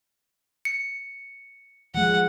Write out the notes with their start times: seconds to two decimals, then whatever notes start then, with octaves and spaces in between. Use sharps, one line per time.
0.65 C#7
1.95 F3 G#3 F#5